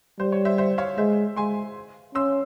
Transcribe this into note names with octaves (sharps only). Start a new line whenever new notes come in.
G3 C5
C#5
C5 E5
C5 E5
C#5 F5
G#3 C5 E5
G#3 G#5 C6
C#4 C6 E6